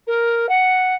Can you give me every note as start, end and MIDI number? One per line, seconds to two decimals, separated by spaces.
0.07 0.49 70
0.49 0.95 78